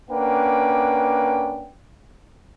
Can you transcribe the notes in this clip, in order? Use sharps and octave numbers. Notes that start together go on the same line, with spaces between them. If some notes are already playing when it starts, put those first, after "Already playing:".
A#3 C#4 D4 B4 F#5 G5